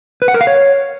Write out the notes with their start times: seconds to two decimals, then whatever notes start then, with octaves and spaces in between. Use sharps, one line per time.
0.22 B4
0.28 F#5
0.34 A#4
0.41 F5
0.47 C#5